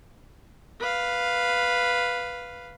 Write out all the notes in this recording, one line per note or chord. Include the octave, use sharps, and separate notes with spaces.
B4 F5